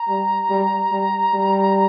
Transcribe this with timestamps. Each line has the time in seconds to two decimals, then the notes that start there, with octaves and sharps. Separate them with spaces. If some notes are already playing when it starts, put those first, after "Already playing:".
Already playing: A#5
0.09 G3
0.50 G3
0.92 G3
1.34 G3